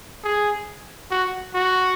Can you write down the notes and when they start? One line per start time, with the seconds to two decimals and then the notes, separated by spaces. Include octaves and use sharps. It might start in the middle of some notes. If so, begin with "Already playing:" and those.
0.24 G#4
1.11 F#4
1.54 F#4